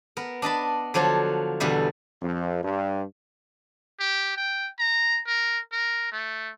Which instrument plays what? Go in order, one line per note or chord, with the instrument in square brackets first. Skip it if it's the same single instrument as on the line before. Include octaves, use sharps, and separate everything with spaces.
[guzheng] B3 A#4
D4 D#5 A5 B5
D3 F3 F#3 D4 F4
E2 B2 D3 G3 E5
[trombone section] F2
G2
[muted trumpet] G4
G5
A#5
A#4
A#4
A3